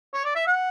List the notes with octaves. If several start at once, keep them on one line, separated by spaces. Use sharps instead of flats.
C#5
D5
E5
F#5